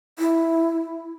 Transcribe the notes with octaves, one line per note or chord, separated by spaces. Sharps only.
E4